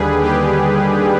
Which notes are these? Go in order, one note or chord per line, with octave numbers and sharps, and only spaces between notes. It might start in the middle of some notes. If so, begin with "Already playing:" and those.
Already playing: D#2 D3 G3 G#4 B4
G4